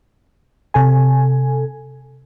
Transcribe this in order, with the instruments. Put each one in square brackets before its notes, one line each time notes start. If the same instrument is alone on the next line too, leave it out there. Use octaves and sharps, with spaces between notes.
[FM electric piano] C3 A4 G#5